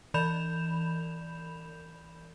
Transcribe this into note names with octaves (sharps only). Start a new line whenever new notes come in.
E3 D5 B5 G6 E7 F7